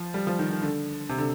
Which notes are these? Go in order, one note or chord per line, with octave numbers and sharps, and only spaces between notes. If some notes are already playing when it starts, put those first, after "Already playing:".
Already playing: F3
G3
F3
D#3
D#3
D3
C3
D3